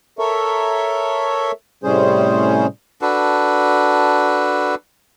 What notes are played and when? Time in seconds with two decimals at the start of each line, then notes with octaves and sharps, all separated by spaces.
0.19 A4 A#4 C#5 E5
1.84 A2 C3 G3 C#4 G#4 C5
3.02 D4 F#4 A4 B4